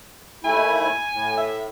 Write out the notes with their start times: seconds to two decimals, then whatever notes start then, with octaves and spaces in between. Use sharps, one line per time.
0.44 D#2 A3 E4 G#5
1.13 A2
1.37 E5